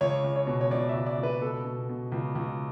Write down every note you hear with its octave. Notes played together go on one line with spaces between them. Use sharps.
C#2 C#5
C#2
C#5
B2
C#5
C#2 D5
E5
C#2
D5
C#2
B4
B2 A4
B2
B2
C#2
C#2